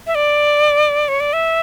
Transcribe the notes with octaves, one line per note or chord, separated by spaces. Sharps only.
E5
D5
C#5
D5
E5